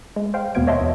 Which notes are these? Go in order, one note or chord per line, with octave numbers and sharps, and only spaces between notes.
G#3
C5 F5 G5
D#2 B2 B3 F5 G#6 D7
C#5 D#5 E5 A5 C6
E2